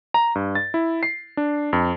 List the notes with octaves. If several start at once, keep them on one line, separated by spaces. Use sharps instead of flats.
A#5
G2
A6
E4
C7
D4
F2